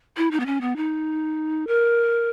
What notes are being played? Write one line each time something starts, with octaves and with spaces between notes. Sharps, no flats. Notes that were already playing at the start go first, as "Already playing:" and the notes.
E4
D#4
B3
C#4
B3
D#4
A#4